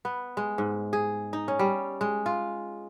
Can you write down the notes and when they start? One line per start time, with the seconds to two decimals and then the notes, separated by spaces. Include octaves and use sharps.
0.05 B3
0.37 G#3
0.58 G#2
0.93 G#4
1.33 D#4
1.48 C#4
1.59 G3
2.01 G#3
2.26 F4